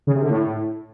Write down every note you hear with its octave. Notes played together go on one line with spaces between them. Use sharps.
C#3
C3
D3
A2